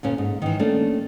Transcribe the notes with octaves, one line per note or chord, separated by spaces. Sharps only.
D2 A#2 C#4
G#2
D#3 E3
A3 A#3 C#4 D4